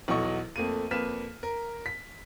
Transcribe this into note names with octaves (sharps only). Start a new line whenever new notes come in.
B1 E2 F#3 A4 D#5 C#6
F2 A3 A#3 D#7
F2 A#3 B4 F6 B6 E7
A#4
B6